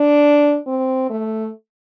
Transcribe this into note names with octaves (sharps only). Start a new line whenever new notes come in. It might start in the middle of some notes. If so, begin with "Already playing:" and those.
Already playing: D4
C4
A3